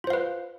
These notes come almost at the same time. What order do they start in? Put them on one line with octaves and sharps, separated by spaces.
F4 C5 F5 B4